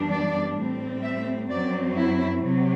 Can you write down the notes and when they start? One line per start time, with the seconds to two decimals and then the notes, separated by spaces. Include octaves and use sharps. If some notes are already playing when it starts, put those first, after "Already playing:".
Already playing: F#2 E3 G3 B3 D4
0.10 D5
0.57 A2 G3 C4
1.03 E5
1.50 F#2 F#3 C4 D5
1.97 E4
2.44 C3 F#3